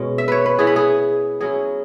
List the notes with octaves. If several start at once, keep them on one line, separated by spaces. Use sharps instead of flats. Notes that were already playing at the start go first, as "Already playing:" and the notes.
Already playing: B2 G#3 C#4
E5
B4 C#5
B4
E3 B3 E4 G#4
B4
G#4
F#3 C#4 E4 G#4